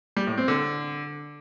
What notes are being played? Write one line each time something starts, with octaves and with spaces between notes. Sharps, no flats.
G3
A2
C4
D3